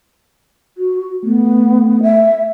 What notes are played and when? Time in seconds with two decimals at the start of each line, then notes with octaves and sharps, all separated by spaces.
0.77 F#4
1.24 A3 B3
2.03 E5